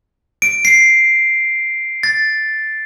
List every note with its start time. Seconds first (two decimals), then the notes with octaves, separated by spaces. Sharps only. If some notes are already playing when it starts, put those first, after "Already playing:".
0.42 D7
0.65 C7
2.03 A6